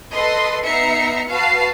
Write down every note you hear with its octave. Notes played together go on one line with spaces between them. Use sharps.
A4 B4 D#5 C6
B3 D#4 E5 A#5 C7 C#7
F#4 B4 F5 A5 C7